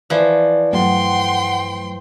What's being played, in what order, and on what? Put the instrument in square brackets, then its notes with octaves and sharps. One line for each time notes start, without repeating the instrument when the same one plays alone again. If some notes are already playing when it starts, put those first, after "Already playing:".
[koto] E3 F3 [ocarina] D5
[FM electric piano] G2 F#3 A3 [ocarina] F#5 [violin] G5 C6